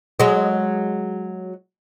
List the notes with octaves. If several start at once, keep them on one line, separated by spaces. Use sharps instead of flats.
F#3 G#3